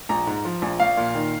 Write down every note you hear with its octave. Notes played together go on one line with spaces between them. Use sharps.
A#1 A#5
G#2
F3
A#1
A#1 F5
A#2
D#3